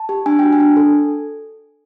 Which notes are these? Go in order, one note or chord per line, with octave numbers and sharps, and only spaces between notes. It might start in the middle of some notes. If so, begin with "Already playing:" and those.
Already playing: A5
G4
D4 G#5
F#4 G5
G#5
D4
A4